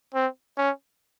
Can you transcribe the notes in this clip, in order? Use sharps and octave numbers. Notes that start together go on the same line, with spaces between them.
C4
C#4